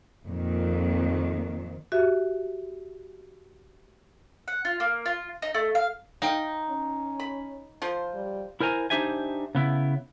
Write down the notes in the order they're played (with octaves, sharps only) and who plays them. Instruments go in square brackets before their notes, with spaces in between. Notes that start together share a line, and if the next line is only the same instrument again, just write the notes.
[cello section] F2 A#2 D#3
[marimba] F#4 G4 E5
[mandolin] F#5
F4
A#3
F4
D#4
A3
F5
[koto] D#4 [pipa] F5 G5
[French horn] C#4
[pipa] B5
F3 F4 C5
[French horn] G3
[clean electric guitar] E4 A#4 C5 G#5 A#5
D4 D#4 G4 C5 E5 G#5
C#3 B3 E4